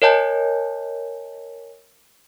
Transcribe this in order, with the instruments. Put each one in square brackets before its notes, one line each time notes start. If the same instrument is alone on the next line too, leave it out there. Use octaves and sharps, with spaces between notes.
[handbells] A#4 C#5 D#5 G#5 A5 G6